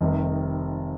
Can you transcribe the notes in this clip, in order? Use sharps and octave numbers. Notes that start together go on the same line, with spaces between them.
F1 F2 C3 D#3 G3 D#5